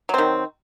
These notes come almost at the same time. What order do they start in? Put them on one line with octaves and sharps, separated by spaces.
F#3 C4 D#3